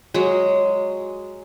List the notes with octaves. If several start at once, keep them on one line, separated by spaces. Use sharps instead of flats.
F#3 G#3